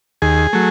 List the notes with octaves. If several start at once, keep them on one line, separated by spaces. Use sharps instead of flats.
D#2 G#4
F#3 A3